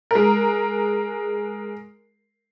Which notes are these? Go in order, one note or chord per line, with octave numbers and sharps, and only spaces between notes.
G#3 A#4